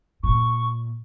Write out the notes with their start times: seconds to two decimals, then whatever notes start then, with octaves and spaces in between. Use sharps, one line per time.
0.23 A#2 C#6